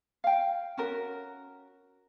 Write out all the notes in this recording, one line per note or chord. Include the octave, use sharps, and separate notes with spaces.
F5 G5
C#4 F#4 A#4